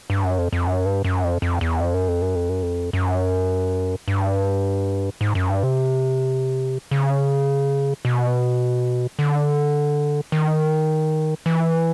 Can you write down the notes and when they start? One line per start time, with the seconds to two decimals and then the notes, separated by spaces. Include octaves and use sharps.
0.10 G2
0.24 F#2
0.38 F2
0.53 F2
0.67 F#2
0.85 G2
1.04 F#2
1.24 F2
1.42 F2
1.61 E2
1.80 F2
1.94 F#2
2.08 F2
2.22 F#2
2.35 F2
2.49 F#2
2.63 F2
2.93 F#2
4.08 G2
5.21 G#2
5.35 F#2
5.50 G2
5.63 C3
6.91 C#3
8.05 B2
9.19 D3
10.32 D#3
11.46 E3